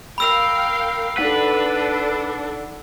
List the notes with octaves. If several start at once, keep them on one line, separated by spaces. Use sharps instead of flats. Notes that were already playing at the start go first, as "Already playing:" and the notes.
A#4 F5 G5 B5 E6 F7
D4 D#4 A4 B4 F#5 B6